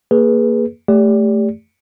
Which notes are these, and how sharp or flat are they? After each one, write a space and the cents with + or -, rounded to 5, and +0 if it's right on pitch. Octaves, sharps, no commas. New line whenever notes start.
A#3 +0 G#4 +0 B4 -15
A3 +0 G4 +20 D5 -30